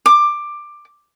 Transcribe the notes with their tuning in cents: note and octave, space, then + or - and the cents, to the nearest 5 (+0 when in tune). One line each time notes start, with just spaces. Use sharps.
D6 +15